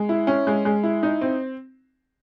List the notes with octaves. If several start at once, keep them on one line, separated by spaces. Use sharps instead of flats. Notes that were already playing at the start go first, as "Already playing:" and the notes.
Already playing: G#3
E4
C#4
G#3
G#3
E4
D#4
C4